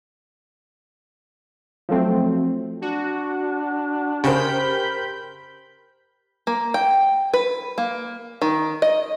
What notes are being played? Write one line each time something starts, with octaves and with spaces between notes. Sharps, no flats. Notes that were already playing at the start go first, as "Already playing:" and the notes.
F3 F#3 A3 C4
D4 F#4
C#3 G4 A#4 C5 B5 G6
A#3
G5
B4
A#3
D#3
D#5